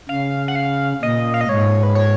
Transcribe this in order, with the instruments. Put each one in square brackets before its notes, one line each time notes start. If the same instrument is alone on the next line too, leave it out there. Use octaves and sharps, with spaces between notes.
[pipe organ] C#3 [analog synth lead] F5
[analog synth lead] F#5
F5
[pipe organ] A#2 [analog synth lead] D#5
[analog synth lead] F5
D#5
[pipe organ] G#2 [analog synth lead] C#5
[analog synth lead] B4
C#5